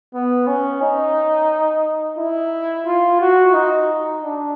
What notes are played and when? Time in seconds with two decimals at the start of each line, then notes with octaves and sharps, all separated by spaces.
0.14 B3
0.47 C#4
0.83 D#4
2.19 E4
2.86 F4
3.21 F#4
3.54 D#4
4.23 D4